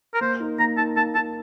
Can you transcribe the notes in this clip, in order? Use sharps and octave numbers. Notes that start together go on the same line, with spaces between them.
A#4
A#3 C5
D#4 A#4
A#3 A#5
D#4 A#4 A5
A#3 A5
D#4 A#4 A5